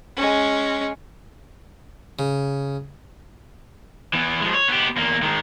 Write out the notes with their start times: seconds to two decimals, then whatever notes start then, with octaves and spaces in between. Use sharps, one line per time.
0.17 G#3 C#4
2.19 C#3
4.14 E3 B3
4.41 F3 G#3
4.54 C#5
4.68 B3 G4
4.97 E2 A#3
5.22 D#3 G#3